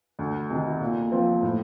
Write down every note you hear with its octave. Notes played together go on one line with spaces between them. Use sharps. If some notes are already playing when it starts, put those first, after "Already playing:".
D2
C3 D#3
A#2
F3 C4
A2